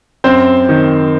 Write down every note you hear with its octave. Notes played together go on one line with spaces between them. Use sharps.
F#2 C4 C5
D#3